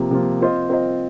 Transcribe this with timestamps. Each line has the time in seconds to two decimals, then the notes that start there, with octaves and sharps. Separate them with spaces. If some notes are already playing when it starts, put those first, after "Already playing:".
Already playing: C3 F3 A#3
0.11 C3 F3 A#3 F4
0.41 C4 F4 C5 D#5
0.70 C4 F4 C5 D#5